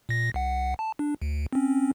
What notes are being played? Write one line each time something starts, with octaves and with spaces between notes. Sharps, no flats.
A#2 A#6
C2 F#5
A5
D4
D2
C4 C#4